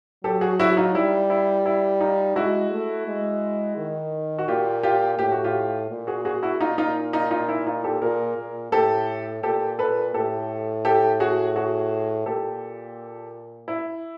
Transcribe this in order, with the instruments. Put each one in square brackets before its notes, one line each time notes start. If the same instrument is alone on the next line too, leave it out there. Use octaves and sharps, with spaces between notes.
[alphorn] F#3 [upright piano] G4 A4
[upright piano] F#4 G#4
E4 F#4
D#4 F4
[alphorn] G3 [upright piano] E4
[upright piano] E4
E4
D#4 F4
[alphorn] G#3 [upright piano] E4 F#4
[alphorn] A3
G#3
D#3
[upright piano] F#4
[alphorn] A#2 [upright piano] F4 G4
[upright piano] F4 G4
[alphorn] A2 [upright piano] G4
[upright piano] F#4
F4 G4
[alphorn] A#2
[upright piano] F#4 G#4
F#4 G#4
E4 F#4
[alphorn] A#2 [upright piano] D#4 F4
[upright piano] D#4 F4
D#4 F4
D#4 F4
E4
D#4 F4
G4 A4
[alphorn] A#2 [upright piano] G#4 A#4
[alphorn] A#2
[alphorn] A2 [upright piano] G4 A4
[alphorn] A#2 [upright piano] G4 A4
[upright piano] A4 B4
[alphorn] A2 [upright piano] G4 A4
[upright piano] G4 A4
F#4 G#4
F#4 G#4
[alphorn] A#2 [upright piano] G4 A4
[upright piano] E4